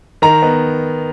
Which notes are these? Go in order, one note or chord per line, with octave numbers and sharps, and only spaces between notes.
D#3 A#5
B3